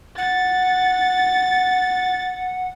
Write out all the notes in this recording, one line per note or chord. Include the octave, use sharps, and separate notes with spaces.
F#5 A6